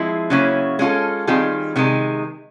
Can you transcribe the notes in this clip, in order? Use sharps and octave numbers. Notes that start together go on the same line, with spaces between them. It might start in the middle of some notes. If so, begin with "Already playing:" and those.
Already playing: F3 G#3 C4 E4
C#3 F#3 A#3 C#4 E4
G#3 C#4 F4 A4
D#3 G3 C4 F4 G#4
C3 D#3 G#3